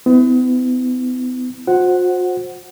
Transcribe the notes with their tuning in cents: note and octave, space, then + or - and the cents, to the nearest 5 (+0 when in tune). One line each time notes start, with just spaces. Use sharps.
B3 +40 E4 -15
F#4 -45 C5 +10 F#5 +0